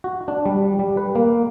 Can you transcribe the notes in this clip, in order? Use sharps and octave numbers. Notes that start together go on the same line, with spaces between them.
F#4
D4
G3
G3
B4
A#3